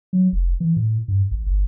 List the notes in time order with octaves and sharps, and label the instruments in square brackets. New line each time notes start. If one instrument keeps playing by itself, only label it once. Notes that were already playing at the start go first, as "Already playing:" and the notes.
[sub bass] F#3
F1
E3
A2
G2
A1
G1